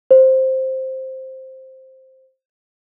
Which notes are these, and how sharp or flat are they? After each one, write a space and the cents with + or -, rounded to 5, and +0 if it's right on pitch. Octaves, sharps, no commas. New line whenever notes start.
C5 +5